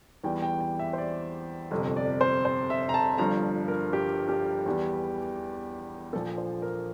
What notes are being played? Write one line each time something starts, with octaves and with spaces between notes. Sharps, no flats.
E2 E3 G3 G5
G5
G5
E5
C5
D5
G1 F2 C3
D5
C5
C5
E5
A#5
A5
G1 G2 F3 A#5
A#4
G4
G4
E2 E3 G3
A#1 A#2 F3 A4
C5
A#4